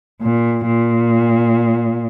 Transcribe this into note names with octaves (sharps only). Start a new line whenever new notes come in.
A#2
A#2